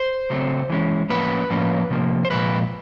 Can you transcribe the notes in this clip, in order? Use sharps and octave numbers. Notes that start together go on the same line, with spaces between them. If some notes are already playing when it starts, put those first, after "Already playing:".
Already playing: C5
C#3 F#3 A3 C4
E3 G#3 C#4
A2 F3 A#3 C#4 B4
A2 F3 A#3 C#4
C3 F3 A#3
C5
A#2 F3 G#3 B4